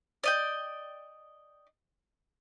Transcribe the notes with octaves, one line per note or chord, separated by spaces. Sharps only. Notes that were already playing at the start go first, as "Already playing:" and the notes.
D5 D#5 G5